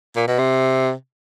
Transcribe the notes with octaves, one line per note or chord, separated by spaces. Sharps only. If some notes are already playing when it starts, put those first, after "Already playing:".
A#2
B2
C3